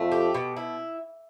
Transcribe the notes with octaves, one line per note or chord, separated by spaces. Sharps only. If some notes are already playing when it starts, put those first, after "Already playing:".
Already playing: F2 A3
G4
B2
E4